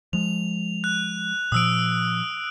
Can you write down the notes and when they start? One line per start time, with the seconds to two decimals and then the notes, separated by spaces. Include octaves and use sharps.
0.13 F3 G#3 F7
0.84 F#6
1.52 A#2 F3 D#6 E6 D7